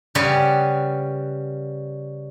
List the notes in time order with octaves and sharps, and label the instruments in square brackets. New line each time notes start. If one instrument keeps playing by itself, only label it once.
[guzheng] C#3 G3 B4 D5 F#5